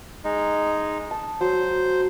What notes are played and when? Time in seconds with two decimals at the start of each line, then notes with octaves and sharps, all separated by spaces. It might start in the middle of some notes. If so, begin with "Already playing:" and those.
0.24 G#3 D#4
1.11 A5
1.41 F#3 C5